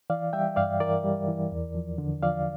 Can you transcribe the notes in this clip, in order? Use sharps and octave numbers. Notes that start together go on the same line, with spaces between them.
E3 D5 F5
G3 E5 G5
G2 D5 F5
E3 A#4 D5
G3
E3
E2
F3
D3
F3 D5 F5